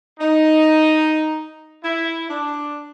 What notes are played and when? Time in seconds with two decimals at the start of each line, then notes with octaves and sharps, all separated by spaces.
0.19 D#4
1.84 E4
2.29 D4